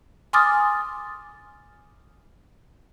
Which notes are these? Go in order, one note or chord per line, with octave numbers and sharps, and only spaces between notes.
G#5 C6 D6 D#6 F6 A6